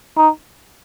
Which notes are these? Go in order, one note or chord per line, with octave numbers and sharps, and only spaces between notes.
D#4